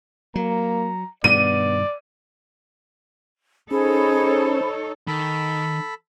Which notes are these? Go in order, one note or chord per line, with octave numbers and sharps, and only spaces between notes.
F#3 A#3 A#5
G2 B2 D#3 B3 D5 D#7
C#4 D#4 G#4 A4 C5 C#5 B5
D#3 A4 B5